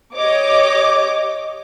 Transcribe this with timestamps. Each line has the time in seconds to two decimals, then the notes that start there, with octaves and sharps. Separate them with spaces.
0.16 G4 C#5 D#5 D6